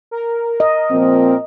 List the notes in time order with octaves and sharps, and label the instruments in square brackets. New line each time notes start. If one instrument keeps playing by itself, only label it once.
[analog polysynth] A#4
[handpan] D#5
[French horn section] A#2 F3 C4